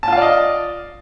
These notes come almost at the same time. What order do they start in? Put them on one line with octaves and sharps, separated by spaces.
A5 F4 F5 D5 D#5